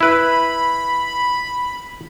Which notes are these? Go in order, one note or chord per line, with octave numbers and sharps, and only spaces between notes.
E4 B4 B5